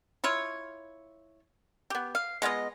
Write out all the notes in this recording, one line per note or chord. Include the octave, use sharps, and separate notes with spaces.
E4 F4 C#5
B3 G4
F5
G#3 B3 F4 D#5